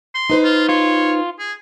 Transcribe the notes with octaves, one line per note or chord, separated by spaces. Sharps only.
C6
D#4 B4 C5
F4
F4 C#5
G#4